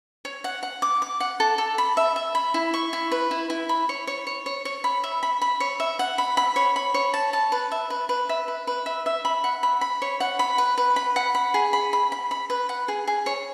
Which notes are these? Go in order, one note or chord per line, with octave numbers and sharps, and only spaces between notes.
C#5
F#5
F#5
D6
D6
F#5
A4
A4
B5
E5
E5
B5
E4
C#6
E4
B4
E4
E4
B5
C#5
C#5
C#5
C#5
C#5
B5
E5
B5
B5
C#5
E5
F#5
B5
B5
C#5
B5
C#5
A5
A5
B4
E5
B4
B4
E5
B4
B4
E5
E5
B5
F#5
B5
B5
C#5
F#5
B5
B4
B4
B5
F#5
B5
G#4
B5
B5
B5
B5
B4
F#5
G#4
G#4
C#5